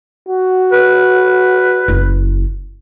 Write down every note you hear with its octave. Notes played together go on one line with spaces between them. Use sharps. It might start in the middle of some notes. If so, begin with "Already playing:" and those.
F#4
B4
F#1 E4